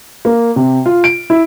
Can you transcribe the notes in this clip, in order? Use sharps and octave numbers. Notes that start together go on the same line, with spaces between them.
A#3
C3
F4
D7
E4